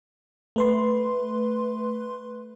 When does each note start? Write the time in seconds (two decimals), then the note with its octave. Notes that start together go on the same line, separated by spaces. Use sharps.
0.56 A3 B4 C6